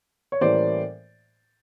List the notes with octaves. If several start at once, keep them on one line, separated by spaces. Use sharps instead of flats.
C#5
A2 E3 G3 A#3 C#4 C5 D5